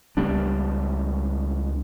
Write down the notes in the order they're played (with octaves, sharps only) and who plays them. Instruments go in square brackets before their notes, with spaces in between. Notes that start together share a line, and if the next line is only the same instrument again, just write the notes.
[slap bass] C#2 G3 B3 D4